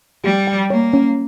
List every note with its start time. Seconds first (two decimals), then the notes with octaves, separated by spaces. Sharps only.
0.24 G3 G4
0.47 G5
0.70 A#3 C#5
0.93 C#4